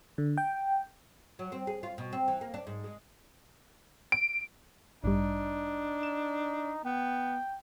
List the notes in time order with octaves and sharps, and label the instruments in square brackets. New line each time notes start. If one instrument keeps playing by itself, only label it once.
[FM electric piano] D3
G5
[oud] F#3
C4
G#4
F4
B2
C4
E3
A#3
D4
G#2
G#3
[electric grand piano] D7
[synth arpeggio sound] A1 G2 G3 [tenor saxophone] D4 [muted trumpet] D#4
[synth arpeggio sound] E7
[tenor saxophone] B3 [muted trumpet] G5